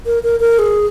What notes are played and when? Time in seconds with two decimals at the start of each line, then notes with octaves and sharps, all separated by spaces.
0.06 A#4
0.23 A#4
0.40 A#4
0.59 G#4